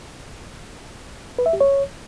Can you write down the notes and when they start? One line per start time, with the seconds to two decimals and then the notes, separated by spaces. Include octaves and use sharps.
1.39 B4
1.46 E5
1.53 G4
1.61 C#5